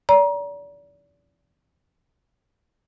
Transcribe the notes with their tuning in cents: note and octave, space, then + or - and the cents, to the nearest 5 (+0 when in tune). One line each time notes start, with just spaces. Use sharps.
D5 -35 A#5 +30